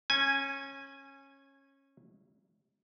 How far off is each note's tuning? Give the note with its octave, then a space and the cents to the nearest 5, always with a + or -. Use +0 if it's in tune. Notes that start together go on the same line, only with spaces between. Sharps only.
C#4 -20 G#5 +0